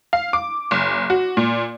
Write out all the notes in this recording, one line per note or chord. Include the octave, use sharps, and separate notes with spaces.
F5
D6
F#1
F#4
A#2